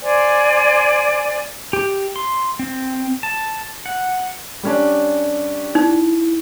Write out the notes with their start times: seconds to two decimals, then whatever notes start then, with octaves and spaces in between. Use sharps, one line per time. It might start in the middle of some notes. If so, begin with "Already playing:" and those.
0.01 C5 D5 G#5
1.73 G4
2.16 C6
2.59 C4
3.23 A5
3.86 F#5
4.63 G3 C#4 D4
5.75 D#4 E4